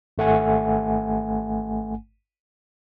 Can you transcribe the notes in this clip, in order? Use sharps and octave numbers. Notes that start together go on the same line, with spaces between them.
G#1 A3 F#5 G#5